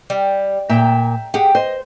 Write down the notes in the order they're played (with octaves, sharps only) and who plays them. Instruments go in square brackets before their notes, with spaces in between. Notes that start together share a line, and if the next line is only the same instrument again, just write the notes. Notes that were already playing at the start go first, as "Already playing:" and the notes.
[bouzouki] G3
[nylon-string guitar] A#2 [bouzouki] E5 G5 A#5
[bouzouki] G4 [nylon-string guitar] G#4 F#5
[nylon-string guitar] C5 [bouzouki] D#5